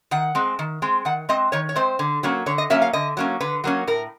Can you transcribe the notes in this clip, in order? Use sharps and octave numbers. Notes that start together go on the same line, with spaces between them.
D#3 F#5
G#3 C4
D#3
G#3 C4
D#3 F#5
G#3 C4 D#5
D#3 C#5
C#5
G#3 C4 C5
D3
F#3 A#3 C#4
D3 C#5
D#5
F#3 A#3 C#4 E5
F5
D3 D#5
F#3 A#3 C#4
D3 B4
F#3 A#3 C#4
A2 A#4